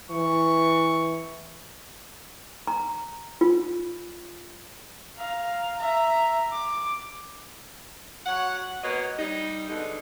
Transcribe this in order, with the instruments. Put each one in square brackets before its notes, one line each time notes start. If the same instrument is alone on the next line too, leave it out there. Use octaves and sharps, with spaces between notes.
[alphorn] E3 [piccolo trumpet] C#6
[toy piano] A#5
F4
[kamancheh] F5 A#5
E5 A#5
D6
[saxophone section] F#3 C#5 F#5
A#3 B3 F#4 C#5 D#5
G3 D#4
B2 D3 G#3 D#4